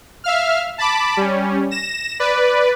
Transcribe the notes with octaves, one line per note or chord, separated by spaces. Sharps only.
E5 F5 F6
A5 B5 D6
G3 C#4
A#6 E7
B4 D5